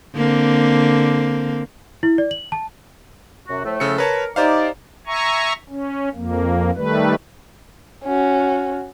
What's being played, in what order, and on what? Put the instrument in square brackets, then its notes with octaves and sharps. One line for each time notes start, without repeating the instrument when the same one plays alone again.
[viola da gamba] D3 A#3 C4
[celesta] E4
D5
F#7
A5
[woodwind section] F#2 C3 F#4
A2 F3 A3
[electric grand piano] C#3 A4 C#7
[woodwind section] A#4 [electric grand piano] B4 C#5 A5
[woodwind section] D#4 D5 [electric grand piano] G4 C5 F5
[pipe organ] E5 G#5 A#5 C#6
C#4
F2 A#3
D#3 G3 A3 B4
[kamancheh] C#4 F#4